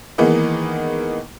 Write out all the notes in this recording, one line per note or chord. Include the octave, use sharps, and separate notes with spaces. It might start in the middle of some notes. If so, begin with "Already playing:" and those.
D#3 E3 G#3 A#3 B3 D#4